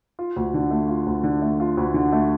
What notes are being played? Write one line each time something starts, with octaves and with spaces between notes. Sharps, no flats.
F4
D2
D3
A3
F4
D2
D3
A3
F4
D2
D3
A3